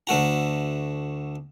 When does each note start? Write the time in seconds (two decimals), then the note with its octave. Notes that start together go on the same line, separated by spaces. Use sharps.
0.07 D2 A3 F#4 A#5